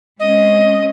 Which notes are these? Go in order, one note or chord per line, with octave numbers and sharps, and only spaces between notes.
G#3 C4 C#4 D#5